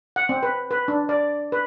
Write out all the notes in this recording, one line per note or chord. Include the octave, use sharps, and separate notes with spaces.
F#5
C4
B4
B4
D4
D5
B4